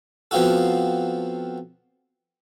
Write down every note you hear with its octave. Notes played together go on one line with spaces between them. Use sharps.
F3 B3 C4 F4 F#4 A4